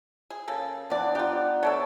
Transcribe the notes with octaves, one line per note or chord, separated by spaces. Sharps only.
G#4
C#3 A#3 A4
E3 F3 B3 D4 D5
D4 D#4 F4 G4 F#5
A3 D4 F#4 A4 C#5